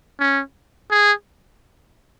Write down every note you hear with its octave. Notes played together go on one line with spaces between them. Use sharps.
C#4
G#4